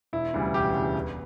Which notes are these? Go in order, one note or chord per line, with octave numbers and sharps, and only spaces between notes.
E1 E4
D2 C#3 E3 G3
E1 G4
D2 C#3 E3 G3
E2